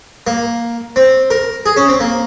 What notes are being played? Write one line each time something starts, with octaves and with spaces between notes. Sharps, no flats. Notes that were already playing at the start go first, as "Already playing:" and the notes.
A#3
C4
A#4
G#4
C#4
C4
A#3